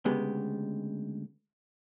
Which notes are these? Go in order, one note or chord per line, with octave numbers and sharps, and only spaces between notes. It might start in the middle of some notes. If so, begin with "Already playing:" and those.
D2 C#3 G#3 B3 G4